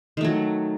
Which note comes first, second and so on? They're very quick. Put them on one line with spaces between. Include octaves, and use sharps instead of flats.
D#3 A3 F#3